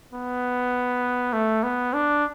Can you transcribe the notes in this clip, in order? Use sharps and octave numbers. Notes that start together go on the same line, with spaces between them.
B3
A3
B3
D4